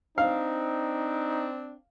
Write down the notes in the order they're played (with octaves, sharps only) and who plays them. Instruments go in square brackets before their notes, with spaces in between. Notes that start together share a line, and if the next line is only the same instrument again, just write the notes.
[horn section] C4 D4 [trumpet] D#4 [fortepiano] F5